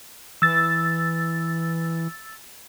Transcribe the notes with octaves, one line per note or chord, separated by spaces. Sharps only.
E3 E6 A6